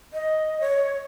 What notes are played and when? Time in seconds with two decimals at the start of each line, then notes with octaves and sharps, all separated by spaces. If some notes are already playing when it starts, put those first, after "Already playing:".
0.13 D#5
0.61 C#5